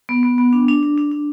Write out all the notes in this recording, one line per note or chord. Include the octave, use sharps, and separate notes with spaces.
B3
B3
B3
D4
D4
D4
D4
D4